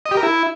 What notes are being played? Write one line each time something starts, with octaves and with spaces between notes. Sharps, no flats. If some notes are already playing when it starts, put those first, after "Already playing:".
D#5
G4
A#4
E4